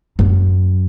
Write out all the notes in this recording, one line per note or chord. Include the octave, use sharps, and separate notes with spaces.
F#2